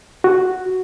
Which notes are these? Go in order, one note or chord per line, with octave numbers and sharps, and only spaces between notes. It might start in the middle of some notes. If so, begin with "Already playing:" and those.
F#4